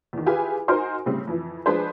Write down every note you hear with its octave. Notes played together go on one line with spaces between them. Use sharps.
E2 D#3
E4 F4 G4 G#4 B4 G#5
D#4 F#4 A#4 C5 G#5 C6
A2 C#3 G3 C4
F2 E3
F3 G#3 D4 G#4 B4 C5